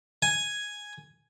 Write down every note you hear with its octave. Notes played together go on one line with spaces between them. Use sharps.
G#5